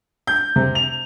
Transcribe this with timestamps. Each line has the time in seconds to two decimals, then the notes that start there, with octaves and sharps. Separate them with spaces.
0.27 G6
0.56 C3
0.75 F7